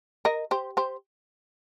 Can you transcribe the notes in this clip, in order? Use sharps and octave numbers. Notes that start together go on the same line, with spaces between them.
A#4 D#5
G4 C5
G4 C5